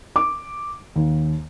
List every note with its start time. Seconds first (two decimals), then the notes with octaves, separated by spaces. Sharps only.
0.16 D6
0.96 D#2